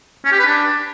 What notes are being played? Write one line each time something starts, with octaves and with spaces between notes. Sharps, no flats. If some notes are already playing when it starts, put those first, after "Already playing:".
C#4
G4
B4
D4